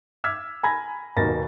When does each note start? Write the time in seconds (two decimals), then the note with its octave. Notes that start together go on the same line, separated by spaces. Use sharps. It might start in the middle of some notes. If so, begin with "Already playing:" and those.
0.24 D6 E6 F6 G#6 B6
0.63 G#5 A#5 B5 G#6 A#6
1.16 D#1 B2 A#3 B5 A6 A#6